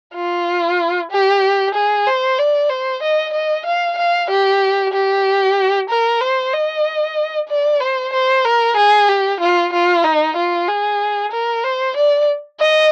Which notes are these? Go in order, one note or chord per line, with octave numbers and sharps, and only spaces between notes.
F4
G4
G#4
C5
D5
C5
D#5
D#5
F5
F5
G4
G4
A#4
C5
D#5
D5
C5
C5
A#4
G#4
G4
F4
F4
D#4
F4
G#4
A#4
C5
D5
D#5